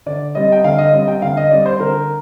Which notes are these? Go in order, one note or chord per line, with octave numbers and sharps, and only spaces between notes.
D3 D5
G3 C4 D#5
G5
D3 F5
D#5
G3 C4 D#5
G5
D3 F5
D#5
G3 C4 D5
C5
D3 A#4